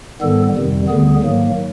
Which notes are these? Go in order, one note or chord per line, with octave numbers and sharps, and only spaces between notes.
G#2 D#3 G3 B3 A4
F2 C3 D#3 G3
D2 D3 G3 B3 G#4
G#2 D#3 F#3 A#3